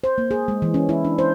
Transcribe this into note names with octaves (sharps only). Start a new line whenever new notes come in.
C5
A#3
G#4
G#3
E3
C#4
E4
D4
C5